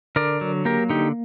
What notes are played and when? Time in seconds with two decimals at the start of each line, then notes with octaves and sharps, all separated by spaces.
0.16 D3 A#4 D5
0.41 F#3
0.65 A#3 G4 A#4
0.90 D3 D#4 G4